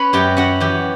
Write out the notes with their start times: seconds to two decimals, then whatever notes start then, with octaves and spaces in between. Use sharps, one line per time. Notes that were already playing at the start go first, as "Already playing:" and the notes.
Already playing: C#4 B4 B5
0.13 F#2 G4 G5
0.37 C#4 F#4 F#5
0.60 E3 G4